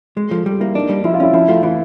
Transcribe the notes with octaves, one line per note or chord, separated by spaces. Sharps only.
G#3 G#4
F3 A4
G3 A4
A#3 E4
D4 D#4
G3
F3 E4
F4
C#4 E4
F3 E4
A3 F4
E3 E4